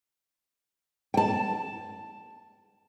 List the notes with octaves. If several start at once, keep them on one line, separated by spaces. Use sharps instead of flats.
G5 A5